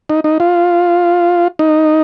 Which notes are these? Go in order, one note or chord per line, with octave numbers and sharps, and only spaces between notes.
D#4
D#4
F4
D#4